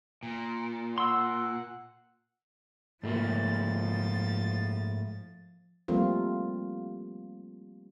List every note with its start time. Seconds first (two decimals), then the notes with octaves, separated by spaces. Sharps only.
0.23 A#2
0.98 F#5 C6 E6
3.03 G#2 F3 A3 A#3 A6
5.88 F3 G3 A3 A#3 C4 F4